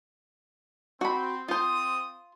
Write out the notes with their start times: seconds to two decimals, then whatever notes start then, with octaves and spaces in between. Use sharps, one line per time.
1.01 C4 F#4 B5
1.48 C4 F4 C5 D#6